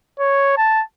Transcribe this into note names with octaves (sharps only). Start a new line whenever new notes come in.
C#5
A5